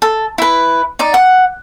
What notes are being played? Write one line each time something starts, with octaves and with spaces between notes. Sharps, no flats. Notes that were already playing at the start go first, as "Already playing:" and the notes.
A4
E4 B4
D#4 D5 D6
F#5